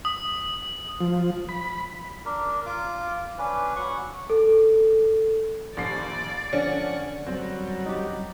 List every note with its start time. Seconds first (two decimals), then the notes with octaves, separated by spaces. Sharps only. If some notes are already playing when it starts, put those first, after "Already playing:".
0.05 D#6
1.00 F3
1.49 B5
2.25 D4 A#4
2.66 F4 D6
3.38 C#4 D4 B4
3.76 F#3 F#5 C#6
4.30 A4
5.77 A#1 D#2 D5 C7
6.53 D3 F3 C#4 F#5 C#6
7.27 F#2 F#3 G3 C4 F#4
7.86 D#4 G4